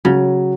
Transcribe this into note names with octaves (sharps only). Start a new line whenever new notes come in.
C#3 F#3